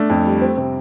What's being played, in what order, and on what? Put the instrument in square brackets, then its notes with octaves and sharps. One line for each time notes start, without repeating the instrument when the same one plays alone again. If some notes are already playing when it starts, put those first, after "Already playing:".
Already playing: [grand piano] A3 [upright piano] D4
[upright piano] F2
G3
C4
C3